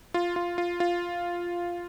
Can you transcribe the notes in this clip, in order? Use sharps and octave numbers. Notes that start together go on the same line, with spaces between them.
F4
F4
F4
F4